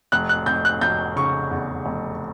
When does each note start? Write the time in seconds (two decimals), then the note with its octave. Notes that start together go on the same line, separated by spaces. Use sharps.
0.12 F1 F#6
0.29 F#6
0.46 F1 G6
0.65 F#6
0.81 F1 G6
1.16 C#3 C#6
1.51 E2
1.86 F1